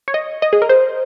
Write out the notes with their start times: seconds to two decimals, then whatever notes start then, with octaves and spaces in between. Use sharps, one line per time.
0.08 C#5
0.14 D#5
0.42 D#5
0.53 G#4
0.62 A#4
0.69 C5